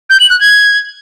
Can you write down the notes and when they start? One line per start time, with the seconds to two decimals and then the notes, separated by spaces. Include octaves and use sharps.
0.10 G6
0.20 F#7
0.30 F#6
0.40 G#6